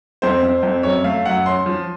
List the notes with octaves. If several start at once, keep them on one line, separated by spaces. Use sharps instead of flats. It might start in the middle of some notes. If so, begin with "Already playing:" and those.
F2 C5
F2
F2
F#2 C#5
A3 F5
F#2 F#5
C#4 C6
F3